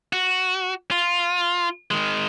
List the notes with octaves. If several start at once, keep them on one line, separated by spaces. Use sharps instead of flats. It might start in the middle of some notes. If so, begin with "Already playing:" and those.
F#4
F4
D#3 G#3